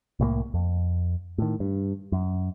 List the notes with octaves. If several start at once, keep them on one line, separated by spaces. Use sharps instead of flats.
C2 A2 F#3 A#3
F2
A2 D#3
G2
F#2